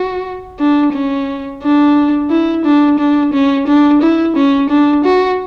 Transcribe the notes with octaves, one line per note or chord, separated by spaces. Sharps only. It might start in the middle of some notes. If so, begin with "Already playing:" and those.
Already playing: F#4
D4
C#4
D4
E4
D4
D4
C#4
D4
E4
C#4
D4
F#4